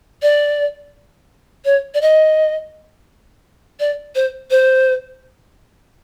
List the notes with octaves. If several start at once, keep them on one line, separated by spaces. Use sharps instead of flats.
D5
C#5
D5
D#5
D5
C5
C5